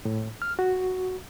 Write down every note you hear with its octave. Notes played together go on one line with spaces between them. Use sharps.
A2
F6
F#4